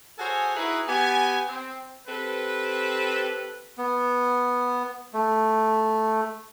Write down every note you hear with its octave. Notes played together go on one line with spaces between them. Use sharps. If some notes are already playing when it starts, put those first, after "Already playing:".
F#4 G#4 A4 C5 C#5 G#5
D#4 E4 F#4 G#4 B4
B3 G4 G#5
C4
C4 G4 A4 B4
B3
A3